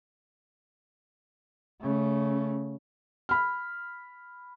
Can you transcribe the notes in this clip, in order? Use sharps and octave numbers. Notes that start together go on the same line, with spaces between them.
C#3 A3
B5 F6